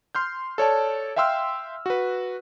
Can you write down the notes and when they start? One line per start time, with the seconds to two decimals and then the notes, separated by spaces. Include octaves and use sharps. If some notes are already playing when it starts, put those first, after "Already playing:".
0.15 C6 F6 G6
0.58 A4 C#5 D5 A5
1.16 E5 F5 G5 C6 E6 F6
1.86 F#4 B4